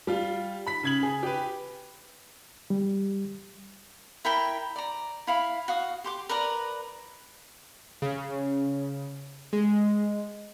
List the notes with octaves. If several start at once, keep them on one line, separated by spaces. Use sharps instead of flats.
G3 F4
B5 B6
C#3 G#6 F#7
G#4
G4 B4
G3
E4 A#4 G5 B5
D5 A#5
E4 F5 B5
F#4 F5 D#6
G4 C6 D6
A#4 B4 D5 A#5
C#3
G#3